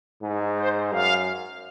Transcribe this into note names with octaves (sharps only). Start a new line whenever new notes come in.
G#2
C5
F#2 F5